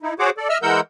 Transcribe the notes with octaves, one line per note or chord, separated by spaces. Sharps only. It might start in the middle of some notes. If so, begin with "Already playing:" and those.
D#4 E4
F#4 G#4 C5 C#5 F#5 D6
A4 D5
D#5 E5 E6 F6
E3 G#3 A#4 F#5 E6 G6